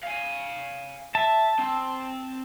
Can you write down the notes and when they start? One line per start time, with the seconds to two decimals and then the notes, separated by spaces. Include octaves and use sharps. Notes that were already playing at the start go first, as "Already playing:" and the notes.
0.03 F5 G#5
1.15 E5 A5
1.59 C4